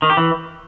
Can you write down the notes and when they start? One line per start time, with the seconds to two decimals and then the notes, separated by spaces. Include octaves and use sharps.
0.02 D#3
0.10 G4
0.17 E3